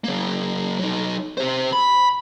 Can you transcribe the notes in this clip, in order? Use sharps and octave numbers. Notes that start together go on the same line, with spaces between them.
F#3 A#3
F#3 D#4
G4 C5
B5